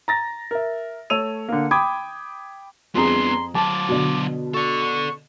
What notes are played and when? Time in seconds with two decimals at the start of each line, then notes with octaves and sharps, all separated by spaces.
0.08 A#5 A6 A#6
0.51 A#4 E5
1.10 A3 C#5 E6 D#7 F7
1.48 D3 A#3
1.71 G5 B5 D6 D#6 G#6
2.95 F2 B3 D4 G#4 A#5 C6
3.55 F#3 C5 A5 D6
3.89 B2 D3
4.54 A4 D5 C#6